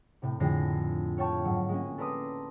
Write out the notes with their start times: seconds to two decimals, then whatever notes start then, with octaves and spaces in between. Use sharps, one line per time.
0.22 A2 C3
0.40 F2 A2 D3 G#3 A#6 C7
1.18 C#5 F5 G5 A5 C#6
1.45 G#2 F#3
1.69 G#3 A#3 C#4
1.98 A4 B4 D5 A#5 C6 D#6